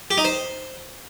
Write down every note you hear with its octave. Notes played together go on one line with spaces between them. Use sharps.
G4
D#4
C5